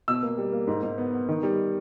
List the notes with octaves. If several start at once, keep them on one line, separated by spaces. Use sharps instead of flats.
B2 E6
A#3
G3
A#3
G#2
G#2
B3
B3
D#3
G3